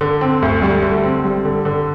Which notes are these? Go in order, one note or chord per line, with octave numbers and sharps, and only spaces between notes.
D3
C4
D2
G3
D3
C4
G3
D3
D3